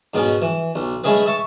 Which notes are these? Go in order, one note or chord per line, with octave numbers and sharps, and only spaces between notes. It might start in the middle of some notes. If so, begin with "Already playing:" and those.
G#2 B2 B3 C#4
E3
B1
G#3 A3 C#4 E4 G#4 B4
E5 A5 C#6